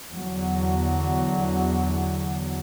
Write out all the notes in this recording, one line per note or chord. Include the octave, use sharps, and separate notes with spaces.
E2 D3 F#3